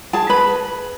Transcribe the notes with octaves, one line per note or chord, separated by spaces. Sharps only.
G#4 A5
B4 B5